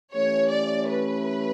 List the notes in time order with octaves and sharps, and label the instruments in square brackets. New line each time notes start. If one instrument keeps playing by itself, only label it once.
[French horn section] E3 A3 C#4 G4 [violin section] C#5
[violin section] D5
B4